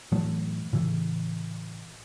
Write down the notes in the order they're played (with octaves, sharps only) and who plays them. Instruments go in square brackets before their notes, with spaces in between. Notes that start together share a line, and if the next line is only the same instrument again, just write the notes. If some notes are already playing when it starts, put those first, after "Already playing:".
[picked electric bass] A2 E3 F#3 A3
A2 C#3 E3